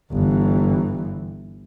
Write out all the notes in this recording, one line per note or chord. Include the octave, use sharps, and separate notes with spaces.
G1 E3